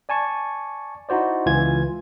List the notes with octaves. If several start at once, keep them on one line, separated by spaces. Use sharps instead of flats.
D5 G#5 A5 C#6
D#4 E4 F#4 C5 D5
C#2 E3 F4 G#5 G#6